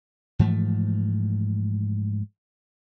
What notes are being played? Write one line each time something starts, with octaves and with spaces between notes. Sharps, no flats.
G#2 E3 F3 A3